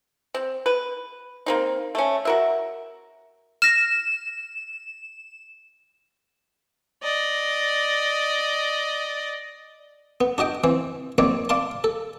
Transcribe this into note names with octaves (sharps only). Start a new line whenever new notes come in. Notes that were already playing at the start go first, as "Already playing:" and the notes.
C4
B4
A#3 C4 D#4
A3 C#4
F#4 A#4 E5
F6 A#6 E7
D5 D#5
B3
D4 F#4 D#5 G5
E3 C4
A#1 D#3 C4 C#5 D5
D5 F5 A5 C6
A4